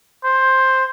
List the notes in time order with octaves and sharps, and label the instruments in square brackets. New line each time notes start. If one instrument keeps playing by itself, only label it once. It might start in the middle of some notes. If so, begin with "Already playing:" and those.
[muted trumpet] C5